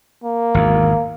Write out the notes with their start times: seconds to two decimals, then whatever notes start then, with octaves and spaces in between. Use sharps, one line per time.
0.24 A#3
0.54 G#1 E2